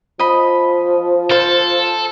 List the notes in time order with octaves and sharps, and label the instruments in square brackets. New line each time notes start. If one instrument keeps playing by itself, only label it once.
[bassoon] F3 [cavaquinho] D#5 B5
[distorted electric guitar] A4 [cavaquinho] C5 F5